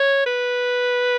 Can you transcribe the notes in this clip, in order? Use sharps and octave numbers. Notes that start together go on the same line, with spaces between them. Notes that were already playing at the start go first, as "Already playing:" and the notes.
Already playing: C#5
B4